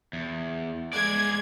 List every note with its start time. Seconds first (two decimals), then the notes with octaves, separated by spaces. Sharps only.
0.13 E2
0.93 G#3 G#4 D5 G#6